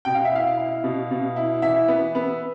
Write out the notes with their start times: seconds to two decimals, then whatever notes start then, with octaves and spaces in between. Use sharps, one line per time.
0.05 B2 G5
0.15 F5
0.25 E5
0.31 E4 F5
0.57 E4
0.84 B2
1.11 B2
1.36 E4
1.62 E3 E5
1.88 B3
2.15 B3